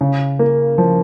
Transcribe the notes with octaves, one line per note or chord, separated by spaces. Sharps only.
C#3
A#3
F3